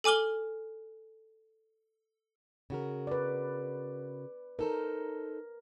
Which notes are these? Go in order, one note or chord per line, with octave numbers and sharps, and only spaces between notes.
A4 G#5 D6 F6 G7
C#3 F#4 A#4
B4 D5
D#4 A4 A#4 C5